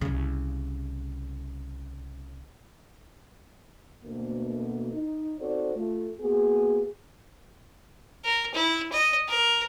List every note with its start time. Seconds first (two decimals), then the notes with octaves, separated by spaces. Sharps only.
0.01 C2 C#3
4.04 D2 B2 A#3
4.93 D#4
5.40 C4 D#4 F#4 A4 C5 D5
5.75 A3 F4
6.21 A#3 B3 F#4 G#4
8.25 A#4
8.54 E4
8.92 D#5
9.28 A#4